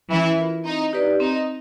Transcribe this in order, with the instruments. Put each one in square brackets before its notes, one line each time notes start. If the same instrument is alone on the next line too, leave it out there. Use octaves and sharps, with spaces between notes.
[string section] E3 E4 [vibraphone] C#4
[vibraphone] F4 A#4
[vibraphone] C4 [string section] D#4
[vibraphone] D#4 G4 B4 D5
[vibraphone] C4 [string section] D#4